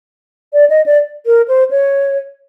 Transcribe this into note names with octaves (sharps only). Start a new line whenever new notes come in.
D5
D#5
D5
A#4
C5
C#5